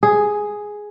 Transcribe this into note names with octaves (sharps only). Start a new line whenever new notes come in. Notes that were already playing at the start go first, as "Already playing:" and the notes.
G#4